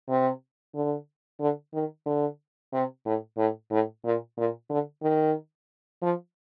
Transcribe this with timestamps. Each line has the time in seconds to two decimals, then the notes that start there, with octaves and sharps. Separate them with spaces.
0.09 C3
0.74 D3
1.40 D3
1.74 D#3
2.06 D3
2.72 C3
3.05 A2
3.37 A2
3.71 A2
4.05 A#2
4.37 A#2
4.70 D3
5.02 D#3
6.02 F3